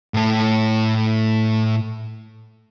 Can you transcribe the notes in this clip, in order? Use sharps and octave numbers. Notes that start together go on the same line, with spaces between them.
A2 A4